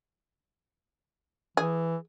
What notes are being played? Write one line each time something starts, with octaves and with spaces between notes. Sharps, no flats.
E3 G#4